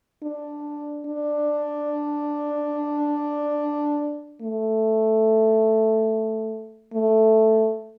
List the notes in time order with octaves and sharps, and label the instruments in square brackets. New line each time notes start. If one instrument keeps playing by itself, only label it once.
[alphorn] D4
D4
A3
A3